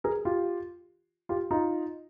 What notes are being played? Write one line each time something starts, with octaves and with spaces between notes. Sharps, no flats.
G#4 A#4
F4 G4
F4 G4
D#4 F4